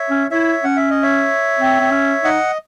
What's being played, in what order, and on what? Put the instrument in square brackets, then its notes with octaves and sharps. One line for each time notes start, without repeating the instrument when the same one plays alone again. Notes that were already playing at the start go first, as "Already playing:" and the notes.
Already playing: [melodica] C#5 E5
[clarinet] C#4
[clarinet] E4 [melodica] C#5 E5
[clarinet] C#4 [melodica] F#5
[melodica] E5
D#5
C#5 E5
[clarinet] C4
C4
C#4
[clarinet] D#4 [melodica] D#5 F#5